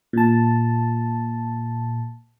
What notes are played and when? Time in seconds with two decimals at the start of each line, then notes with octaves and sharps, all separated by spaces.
0.13 A#2 A5